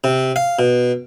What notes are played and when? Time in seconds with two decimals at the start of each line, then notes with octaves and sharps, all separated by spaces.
0.04 C3
0.36 F5
0.59 B2